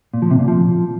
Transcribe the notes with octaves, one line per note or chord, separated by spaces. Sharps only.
A#2
F3
C3
A#2
F3